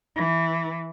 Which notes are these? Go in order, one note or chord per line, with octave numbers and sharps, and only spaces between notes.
E3